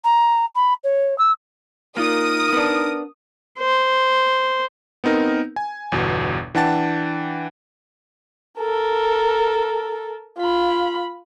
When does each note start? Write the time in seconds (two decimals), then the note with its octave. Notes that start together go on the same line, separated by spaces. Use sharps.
0.04 A#5
0.55 B5
0.84 C#5
1.18 E6
1.97 A#3 D#4 F4 A#4 D#6
2.53 B3 D4
3.59 C5
5.04 B3 C4 D#4 A#4
5.56 G#5
5.92 G1 E2 B2
6.55 E3 D4 F#5 G5 A5 A6
8.59 A4 A#4
10.38 F4 B5